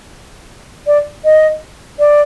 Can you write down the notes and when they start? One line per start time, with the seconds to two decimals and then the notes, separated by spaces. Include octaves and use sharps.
0.87 D5
1.25 D#5
1.99 D5